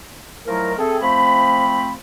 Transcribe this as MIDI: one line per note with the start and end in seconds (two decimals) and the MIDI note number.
0.47 0.74 51
0.47 0.74 53
0.47 0.74 54
0.47 0.74 57
0.47 0.74 64
0.47 0.74 70
0.78 0.98 57
0.78 0.98 60
0.78 0.98 68
0.78 0.98 69
1.01 1.93 53
1.01 1.93 57
1.01 1.93 60
1.01 1.93 83